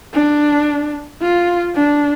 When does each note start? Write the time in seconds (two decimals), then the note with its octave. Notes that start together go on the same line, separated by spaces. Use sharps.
0.13 D4
1.22 F4
1.75 D4